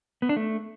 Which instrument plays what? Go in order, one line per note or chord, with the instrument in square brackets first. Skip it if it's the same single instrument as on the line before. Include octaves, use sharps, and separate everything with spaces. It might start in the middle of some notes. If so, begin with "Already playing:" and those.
[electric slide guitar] B3
D4
A3